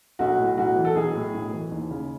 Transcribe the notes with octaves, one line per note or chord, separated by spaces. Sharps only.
B1 F#4
A2
B1 F#4
E3
A4
B1 G#4
A2
B1
E3
D#2
C#3